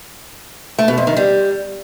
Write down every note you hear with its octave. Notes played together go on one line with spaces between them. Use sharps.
A3
B2
F2
D#3
G3